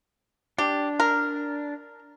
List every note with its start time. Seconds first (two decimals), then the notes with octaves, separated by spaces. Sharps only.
0.58 D4 G4
1.00 A#4